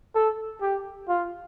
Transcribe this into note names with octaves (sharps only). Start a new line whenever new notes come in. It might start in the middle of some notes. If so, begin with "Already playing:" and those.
A4
G4
F4